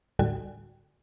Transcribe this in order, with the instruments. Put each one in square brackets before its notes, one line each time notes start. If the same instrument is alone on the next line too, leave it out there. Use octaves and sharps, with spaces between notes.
[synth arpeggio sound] D#2 A2 D3 G3 F#4 G#5